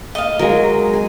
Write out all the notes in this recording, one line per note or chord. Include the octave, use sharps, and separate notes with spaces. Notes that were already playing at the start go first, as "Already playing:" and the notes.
D#5 F5
F#3 G#3 A#4
G#4